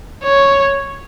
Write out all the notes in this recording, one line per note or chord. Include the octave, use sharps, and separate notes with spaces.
C#5